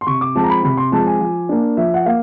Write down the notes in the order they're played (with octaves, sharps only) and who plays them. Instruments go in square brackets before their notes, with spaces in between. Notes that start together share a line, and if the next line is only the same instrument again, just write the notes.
[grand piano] C6
C3 C#6
D6
F3 G#3 C4 A5
A#5
B5
C3 B5
C6
F3 G#3 C4 A5
G#5
F3
A#3 D4
F3 E5
F#5
A#3 F5